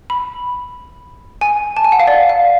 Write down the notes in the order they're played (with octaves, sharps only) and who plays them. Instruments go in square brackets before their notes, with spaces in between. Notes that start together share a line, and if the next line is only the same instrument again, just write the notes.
[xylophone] B5
G#5
A5
G#5
F#5
F5
D5
F5